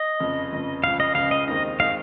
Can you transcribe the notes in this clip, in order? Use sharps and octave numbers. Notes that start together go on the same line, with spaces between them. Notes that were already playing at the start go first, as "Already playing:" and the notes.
Already playing: D#5
F1 F2 C#3
F1 F2 C#3
C#2 C#3 F3 F5
D#5
C#2 C#3 F3 F5
D#5
D#2 D#3 G#3 C4 D#4 D#5
D#3 G#3 C4 D#4 F5